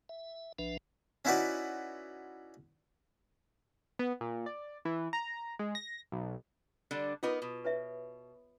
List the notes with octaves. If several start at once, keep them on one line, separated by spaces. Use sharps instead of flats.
E5
B1 F3 D4 B4 E5
C#4 D#4 E4 F#4 B4 D5
B3
A#2
D5
E3
A#5
G#3
A#6
B1
D3 G3 D4
B3 D#4 F4 A#4 B4 D6
B2
B4 C#5 E5